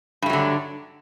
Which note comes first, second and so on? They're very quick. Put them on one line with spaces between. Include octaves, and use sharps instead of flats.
G2 A3 F#3 D3